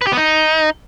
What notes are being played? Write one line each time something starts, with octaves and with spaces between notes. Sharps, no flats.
B4
G4
B3
D#4